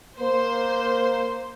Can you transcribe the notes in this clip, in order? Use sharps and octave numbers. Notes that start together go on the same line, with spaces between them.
A#3 C5